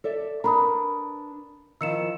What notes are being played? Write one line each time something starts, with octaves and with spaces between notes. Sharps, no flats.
A4 D5 E5
D4 A#4 B4 A#5 B5 D#6
D#3 F3 E4 E6 C#7 E7